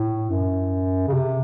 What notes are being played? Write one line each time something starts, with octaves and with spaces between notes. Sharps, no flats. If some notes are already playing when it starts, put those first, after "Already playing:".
Already playing: A2
F#2
C#3
C3